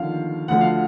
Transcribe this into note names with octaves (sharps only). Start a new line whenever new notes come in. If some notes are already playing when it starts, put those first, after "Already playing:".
Already playing: D#2 D3 F3 F5
D2 D3 F3 F#5
F5